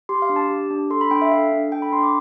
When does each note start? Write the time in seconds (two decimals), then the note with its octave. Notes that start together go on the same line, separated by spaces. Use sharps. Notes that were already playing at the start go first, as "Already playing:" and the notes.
0.09 G4 C6
0.22 F5
0.29 D4
0.36 A5
0.50 G4
0.70 D4
0.90 A4 C6
1.01 B5
1.11 D4 G5
1.22 E5
1.32 A4 F5
1.52 D4
1.72 A4 G5
1.82 B5
1.92 D4 C6
2.03 D6